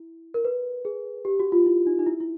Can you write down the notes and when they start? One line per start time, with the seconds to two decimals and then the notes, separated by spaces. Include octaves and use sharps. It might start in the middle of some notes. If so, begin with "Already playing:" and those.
Already playing: E4
0.34 A#4
0.45 B4
0.85 G#4
1.25 G4
1.40 F#4
1.52 F4
1.66 E4
1.87 D#4
1.99 D#4
2.06 E4
2.20 E4